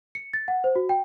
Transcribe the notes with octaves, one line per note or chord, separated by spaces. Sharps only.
C#7
A6
F#5
C5
F#4
G5